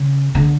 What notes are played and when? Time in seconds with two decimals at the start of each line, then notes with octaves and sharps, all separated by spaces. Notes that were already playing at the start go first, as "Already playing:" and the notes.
Already playing: C#3
0.35 D3